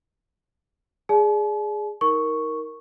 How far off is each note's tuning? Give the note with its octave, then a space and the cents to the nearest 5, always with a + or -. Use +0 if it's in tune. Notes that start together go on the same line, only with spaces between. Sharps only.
G#4 +0 D5 +0 A5 -45
D#4 +30 A#4 +0 C#6 +0